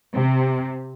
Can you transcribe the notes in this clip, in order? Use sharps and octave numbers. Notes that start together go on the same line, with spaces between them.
C3